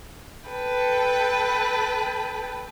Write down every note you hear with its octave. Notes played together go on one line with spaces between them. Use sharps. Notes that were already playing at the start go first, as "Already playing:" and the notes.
A4 B4 G5